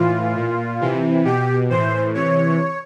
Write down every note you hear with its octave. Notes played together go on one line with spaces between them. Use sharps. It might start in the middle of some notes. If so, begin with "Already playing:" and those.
Already playing: A2 E3 F4
A#2
C3 E3
B2 G4
A2 E3 C5
C3 E3 C#5